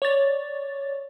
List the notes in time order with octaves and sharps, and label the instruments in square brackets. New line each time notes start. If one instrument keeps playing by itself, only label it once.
[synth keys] C#5 D5 A6